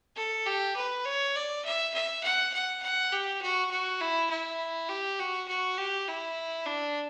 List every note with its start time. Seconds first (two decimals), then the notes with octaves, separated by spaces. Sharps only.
0.16 A4
0.46 G4
0.76 B4
1.05 C#5
1.35 D5
1.65 E5
1.94 E5
2.24 F#5
2.54 F#5
2.83 F#5
3.12 G4
3.42 F#4
3.71 F#4
4.01 E4
4.30 E4
4.89 G4
5.19 F#4
5.48 F#4
5.77 G4
6.08 E4
6.66 D4